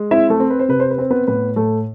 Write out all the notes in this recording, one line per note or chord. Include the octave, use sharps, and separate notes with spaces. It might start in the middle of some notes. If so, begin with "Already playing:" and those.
Already playing: G#3
C4 E4 E5
A3 A4
C4
B4
C5
C3 B4
C5
B4
C4 C5
B3 B4
A2 B3 B4
A2 A3 A4